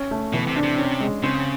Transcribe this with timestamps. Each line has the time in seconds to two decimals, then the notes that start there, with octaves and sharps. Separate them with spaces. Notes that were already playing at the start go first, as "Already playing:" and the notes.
Already playing: C#4
0.11 A3
0.33 B2 E3
0.48 C3
0.56 D4
0.63 C3
0.78 C#4
1.00 G#3
1.23 C#3 C4